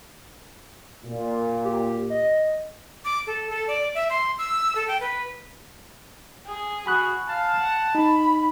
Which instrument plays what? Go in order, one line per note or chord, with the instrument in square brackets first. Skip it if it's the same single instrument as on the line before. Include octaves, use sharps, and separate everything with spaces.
[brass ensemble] A#2
[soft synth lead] G4
D#5
[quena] D6
A4
A4
D5
E5
C6
E6
A4
G5
B4
[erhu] G#4
[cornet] F#4 [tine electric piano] G#5 B5 F#6
[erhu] F5 [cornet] A5
[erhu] F#5
[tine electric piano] D#4 [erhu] B5